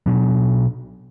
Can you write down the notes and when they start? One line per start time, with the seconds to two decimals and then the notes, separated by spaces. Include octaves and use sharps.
0.06 B2 F#3 B3 D4